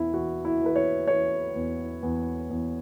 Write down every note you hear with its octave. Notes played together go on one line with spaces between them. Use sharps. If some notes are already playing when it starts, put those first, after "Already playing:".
Already playing: E2 E4
E3 F#4
E4
E3 B4
C#5
E3 C#5
E2
E2
E2